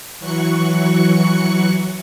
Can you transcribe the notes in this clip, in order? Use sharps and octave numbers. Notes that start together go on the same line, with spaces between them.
E3 F#3 C#6 F#6 C#7